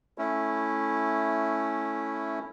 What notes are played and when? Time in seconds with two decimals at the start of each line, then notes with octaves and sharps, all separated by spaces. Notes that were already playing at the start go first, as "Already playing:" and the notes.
0.18 A3 C#4 E4